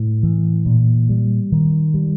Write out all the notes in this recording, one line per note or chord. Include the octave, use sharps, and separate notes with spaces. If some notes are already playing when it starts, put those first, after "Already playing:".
Already playing: A2
E3
A#2
G3
D#3
G3